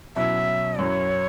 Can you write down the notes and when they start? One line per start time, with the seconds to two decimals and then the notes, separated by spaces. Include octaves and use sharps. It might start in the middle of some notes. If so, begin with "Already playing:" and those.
0.16 B2 F#3 C#4 E4 E5
0.79 F#2 F#3 C#4 E4 C#5